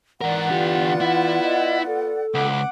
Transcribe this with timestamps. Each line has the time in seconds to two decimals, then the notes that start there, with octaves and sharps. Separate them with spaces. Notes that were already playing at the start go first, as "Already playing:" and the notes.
0.21 G#2 E3 A#4 D5 F#5
0.50 D3 B3 F4 G4
1.01 E4
1.43 D#5
1.87 A4
2.34 C#2 F#5 D6